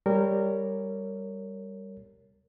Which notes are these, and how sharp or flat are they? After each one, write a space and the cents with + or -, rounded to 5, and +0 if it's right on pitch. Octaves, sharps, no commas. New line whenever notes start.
G3 +5 A#4 -20 C#5 +0